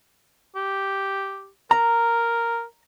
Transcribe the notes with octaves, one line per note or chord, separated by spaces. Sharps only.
G4
A#4 A#5